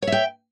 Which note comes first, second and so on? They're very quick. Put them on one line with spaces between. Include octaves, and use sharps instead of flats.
C#5 E5 G5